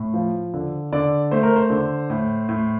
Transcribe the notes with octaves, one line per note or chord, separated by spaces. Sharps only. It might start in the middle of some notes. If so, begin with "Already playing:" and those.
Already playing: A2
F3
D3
D3 D5
A3 C5
A#4
C5
D3
A2
A2